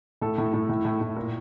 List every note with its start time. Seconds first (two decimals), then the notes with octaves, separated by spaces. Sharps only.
0.21 A2 A4
0.38 A2
0.54 A2
0.69 A2
0.85 A2
1.01 A2
1.16 A#2 A#4